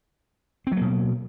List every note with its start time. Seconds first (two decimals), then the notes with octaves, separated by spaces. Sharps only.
0.67 C4
0.72 F#3
0.76 A#3
0.81 B2